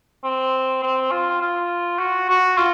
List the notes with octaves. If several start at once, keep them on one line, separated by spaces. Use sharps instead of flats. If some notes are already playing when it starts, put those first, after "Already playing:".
C4
C4
F4
F4
F#4
F#4
F4